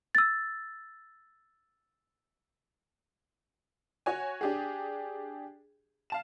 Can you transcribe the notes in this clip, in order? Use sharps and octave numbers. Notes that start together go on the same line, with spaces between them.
E6 A6
F#4 C#5 G#5
D4 G4 G#4
F5 A5 E7